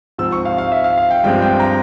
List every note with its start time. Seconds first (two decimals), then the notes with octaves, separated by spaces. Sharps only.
0.18 G#2 F3 C4 E6
0.32 C#6
0.45 F5
0.58 F5
0.72 E5
0.84 F5
0.98 F5
1.10 G5
1.24 G2 F3 G#3 C4 G5
1.42 G5
1.60 A#5